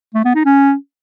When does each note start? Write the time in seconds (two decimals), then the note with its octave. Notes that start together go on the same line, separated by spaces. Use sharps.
0.14 A3
0.25 B3
0.35 D#4
0.45 C#4